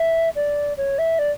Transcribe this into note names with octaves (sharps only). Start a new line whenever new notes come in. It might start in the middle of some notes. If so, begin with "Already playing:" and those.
Already playing: E5
D5
C#5
E5
D5